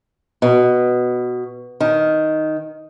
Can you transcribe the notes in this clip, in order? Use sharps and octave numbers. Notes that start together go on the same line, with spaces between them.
B2
D#3